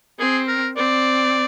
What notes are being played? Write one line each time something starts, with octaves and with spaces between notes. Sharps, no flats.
C4 G#4
A#4
C4 D5